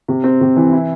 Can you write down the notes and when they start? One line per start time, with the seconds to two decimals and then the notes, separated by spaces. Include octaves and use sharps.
0.08 C3
0.24 C4
0.41 C3
0.56 E3
0.73 E4